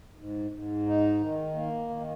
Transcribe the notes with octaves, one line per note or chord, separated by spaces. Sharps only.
G#2
G#2
D#4
D#3
A#3
D#3